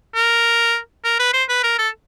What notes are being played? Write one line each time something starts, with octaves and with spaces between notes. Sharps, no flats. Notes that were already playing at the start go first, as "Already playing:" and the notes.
A#4
A#4
B4
C5
B4
A#4
A4